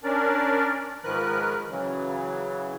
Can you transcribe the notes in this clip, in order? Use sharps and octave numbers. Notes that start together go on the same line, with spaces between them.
C#4 D4 A#4 D5
G#2 D#3 F3 A#4 B4 F#6
C#3 E3 F#3